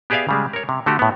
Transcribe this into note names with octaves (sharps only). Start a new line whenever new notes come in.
B3 G4 G#4 D5 E5 F5
C#3 G3 G#3
A#4 C#5
C3
D3 A3 F#4 G4
A2 B3